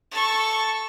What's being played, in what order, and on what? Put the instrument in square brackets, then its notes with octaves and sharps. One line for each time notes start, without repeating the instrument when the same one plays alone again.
[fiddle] A4 C#6